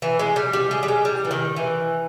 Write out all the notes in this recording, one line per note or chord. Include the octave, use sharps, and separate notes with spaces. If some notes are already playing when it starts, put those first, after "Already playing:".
E3
G#3
G3
G3
G#3
G3
G#3
G3
E3
D#3
E3